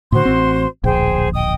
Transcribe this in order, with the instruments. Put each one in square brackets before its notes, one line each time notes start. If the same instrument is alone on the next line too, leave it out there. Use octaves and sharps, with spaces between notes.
[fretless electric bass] A2 D3 [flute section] F#4 C5 C6
[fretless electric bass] A1 C4
[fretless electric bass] D1 A#1 [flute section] G#4 C5 G5
[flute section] D#5 G5 D#6